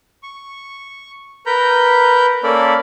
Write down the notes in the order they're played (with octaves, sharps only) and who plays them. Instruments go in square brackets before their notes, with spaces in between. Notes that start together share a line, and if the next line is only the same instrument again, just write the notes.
[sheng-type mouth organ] C#6
A#4 B4 A#5 B5 G6
A#3 C#4 A4 A#4 D5 B5